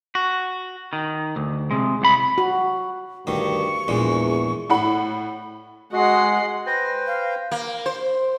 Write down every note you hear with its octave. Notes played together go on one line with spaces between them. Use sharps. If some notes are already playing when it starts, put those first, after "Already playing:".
F#4
D#3
D2
C3 G#3
C2 B5
F#4
D2 G2 D#3 C#6
A#1 E2 A#2 G#3
A2 F#5 B5
G#3 F#4 D#5 F#5 C7
B4 C5 G5 A#6
F5
A#3
C5